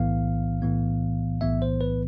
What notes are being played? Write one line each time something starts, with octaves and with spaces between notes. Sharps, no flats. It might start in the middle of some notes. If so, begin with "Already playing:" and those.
Already playing: B1 A2 E3 B3 F5
B1 A2 E3 B3
B1 A2 E3 B3 E5
C5
B4